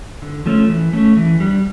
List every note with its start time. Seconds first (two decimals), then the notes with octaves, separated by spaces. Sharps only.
0.22 D3
0.46 F3 A3 C#4
0.69 E3
0.93 A3 C#4
1.17 E3
1.40 G3 D4